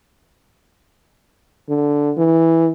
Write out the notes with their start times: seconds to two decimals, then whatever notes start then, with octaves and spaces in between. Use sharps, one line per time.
1.69 D3
2.17 E3